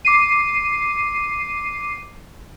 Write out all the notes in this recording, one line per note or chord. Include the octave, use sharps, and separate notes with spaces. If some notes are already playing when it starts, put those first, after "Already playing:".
D6 C7 D#7